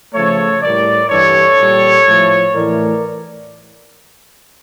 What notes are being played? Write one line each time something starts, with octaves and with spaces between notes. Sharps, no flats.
C#3 F3 A3 A4 C#5
A2 G3 A#4 D5
G2 E3 G3 A4 C#5
A#2 G3
A2 F3 A3
A2 E3 A3 A#4 D5